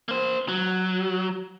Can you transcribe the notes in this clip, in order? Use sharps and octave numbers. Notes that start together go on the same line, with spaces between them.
A#3 C5
F#3